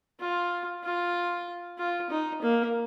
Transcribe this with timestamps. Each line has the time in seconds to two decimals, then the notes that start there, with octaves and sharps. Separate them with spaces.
0.20 F4
0.84 F4
1.78 F4
2.10 D#4
2.42 A#3